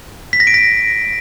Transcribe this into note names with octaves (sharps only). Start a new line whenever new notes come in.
B6
A#6
D7
A#6